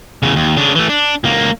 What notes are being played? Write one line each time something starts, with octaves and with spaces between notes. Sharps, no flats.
E2 C#3
D#2
C#3 D4
E3 A3
D4
C#2 A#3